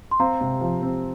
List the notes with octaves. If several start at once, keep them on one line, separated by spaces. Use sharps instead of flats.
C6
C4 F5 A#5
C3
F3
C4